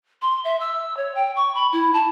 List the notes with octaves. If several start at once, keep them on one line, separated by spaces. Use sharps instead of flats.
C6
E5
E6
C#5
G5
C#6
B5
E4
A5